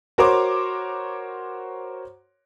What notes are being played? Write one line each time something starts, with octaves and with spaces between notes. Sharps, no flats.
F#4 A#4 C5 C#5 C6 D6